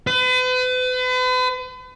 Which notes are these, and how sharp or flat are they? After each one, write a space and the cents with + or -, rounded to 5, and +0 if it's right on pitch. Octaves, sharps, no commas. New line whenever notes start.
B4 +40